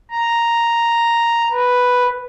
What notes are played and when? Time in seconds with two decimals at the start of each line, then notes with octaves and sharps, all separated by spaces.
0.11 A#5
1.52 B4